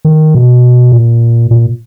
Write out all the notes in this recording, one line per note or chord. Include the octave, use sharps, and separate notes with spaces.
D#3
B2
A#2
A#2